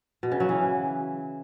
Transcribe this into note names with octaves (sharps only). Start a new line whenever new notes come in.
B2
C#3
F#3
E3